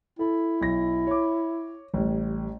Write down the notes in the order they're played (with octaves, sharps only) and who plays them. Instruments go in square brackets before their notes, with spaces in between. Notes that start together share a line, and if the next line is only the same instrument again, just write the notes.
[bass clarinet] E4 [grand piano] A4
[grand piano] B1 A#6
C#5 D6
A1 G3